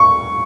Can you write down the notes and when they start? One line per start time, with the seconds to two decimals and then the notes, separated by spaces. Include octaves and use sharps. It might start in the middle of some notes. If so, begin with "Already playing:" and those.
Already playing: C#6